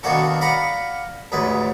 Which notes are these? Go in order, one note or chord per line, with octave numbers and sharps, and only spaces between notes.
B2 D#3 A#3 D4 F#4 A4
D5 F5 F#5 A#5 B5
A1 D2 G#2 B4